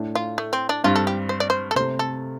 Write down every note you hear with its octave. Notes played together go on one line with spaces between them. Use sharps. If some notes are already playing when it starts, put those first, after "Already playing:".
Already playing: A2 A3 D4
F4
A3
C4
D4
G2 G3 C4 F4
A4
G4
C5
D5
C5
A4
C3 A3 C4 C5
A4